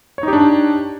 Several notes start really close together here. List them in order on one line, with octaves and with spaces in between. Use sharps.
C#5 D#4 G4 D4